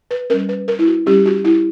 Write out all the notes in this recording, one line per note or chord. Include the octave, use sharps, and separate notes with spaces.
B4
G3 C#4 A#4
B4
A#4
E4
F#4
G3 C#4 G4
F#4
E4